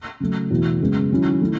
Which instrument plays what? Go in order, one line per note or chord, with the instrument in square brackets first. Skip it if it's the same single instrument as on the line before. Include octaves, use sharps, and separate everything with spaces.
[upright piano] C#3 F#3 A3
E2 B2 A3
F#2 C#3 G#3 B3
D#3 F#3 C#4 E4
D#3 A3 E4